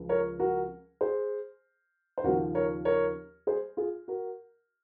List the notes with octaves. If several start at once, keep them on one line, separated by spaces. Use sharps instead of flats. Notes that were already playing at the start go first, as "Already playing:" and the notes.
Already playing: C#2 C#3 F3
A#4 C#5
F#4 A#4
G#4 C5
C5
D#2 C#3 F3 F#4 A#4
A#4 C#5
A#4 C#5
G#4 C5
F4 G#4
F#4 A#4